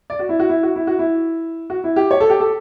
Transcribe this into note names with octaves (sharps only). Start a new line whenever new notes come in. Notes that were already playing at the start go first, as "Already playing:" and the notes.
D5
F#4
E4
F#4
E4
F#4
E4
F#4
E4
F#4
E4
G4
C#5
A4
G4
A4